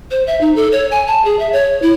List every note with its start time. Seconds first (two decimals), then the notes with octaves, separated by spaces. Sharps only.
0.11 C5
0.27 E5
0.41 D#4
0.56 A4
0.72 C#5
0.91 G#5
1.07 A5
1.25 G#4
1.39 E5
1.53 C#5
1.82 E4